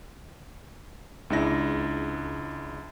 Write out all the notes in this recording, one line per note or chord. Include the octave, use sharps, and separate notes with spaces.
C#2 G#3 D4 E4 A#6